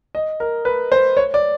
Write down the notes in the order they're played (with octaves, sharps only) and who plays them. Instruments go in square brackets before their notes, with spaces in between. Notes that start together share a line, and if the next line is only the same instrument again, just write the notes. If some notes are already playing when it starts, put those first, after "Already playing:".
[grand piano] D#5
A#4
B4
C5
C#5
D5